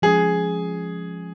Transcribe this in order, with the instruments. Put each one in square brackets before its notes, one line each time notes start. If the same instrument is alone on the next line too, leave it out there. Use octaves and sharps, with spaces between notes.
[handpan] F3 G#3 C#4 [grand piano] G#4